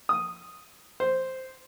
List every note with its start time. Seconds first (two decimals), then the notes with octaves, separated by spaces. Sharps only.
0.09 D#6
1.00 C5